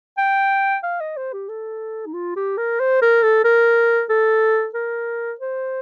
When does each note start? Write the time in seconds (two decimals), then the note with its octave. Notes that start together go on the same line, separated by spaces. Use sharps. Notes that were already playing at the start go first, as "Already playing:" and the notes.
0.18 G5
0.83 F5
1.00 D#5
1.17 C5
1.33 G4
1.48 A4
2.06 D#4
2.14 F4
2.36 G4
2.57 A#4
2.80 C5
3.02 A#4
3.23 A4
3.44 A#4
4.09 A4
4.74 A#4
5.40 C5